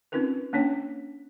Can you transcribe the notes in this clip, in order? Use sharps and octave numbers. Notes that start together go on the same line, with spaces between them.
C4 C#4 D#4 F4 A#4 B4
A#3 C#4 D4 C#5 G5